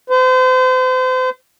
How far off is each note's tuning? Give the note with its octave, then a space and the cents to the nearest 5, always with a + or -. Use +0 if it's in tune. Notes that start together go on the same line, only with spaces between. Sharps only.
C5 -40